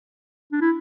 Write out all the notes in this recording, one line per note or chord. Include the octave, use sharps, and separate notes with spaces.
D4
E4